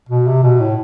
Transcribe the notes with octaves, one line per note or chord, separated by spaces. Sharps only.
B2
C3
B2
A2